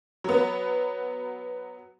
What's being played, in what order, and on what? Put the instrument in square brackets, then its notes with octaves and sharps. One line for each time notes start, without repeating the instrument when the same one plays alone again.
[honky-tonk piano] F#3 B3